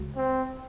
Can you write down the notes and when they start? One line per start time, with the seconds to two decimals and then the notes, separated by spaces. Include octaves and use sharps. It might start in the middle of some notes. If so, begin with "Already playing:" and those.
Already playing: C#2 C#3 G#3 F#4
0.16 C4